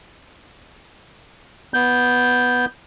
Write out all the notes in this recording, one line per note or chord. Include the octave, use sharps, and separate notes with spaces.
B3 G6